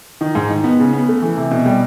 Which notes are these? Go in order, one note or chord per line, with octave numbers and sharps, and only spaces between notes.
D#3
G#2
D#3
B3
C#3
B3
A3
E3
C3
B2
G3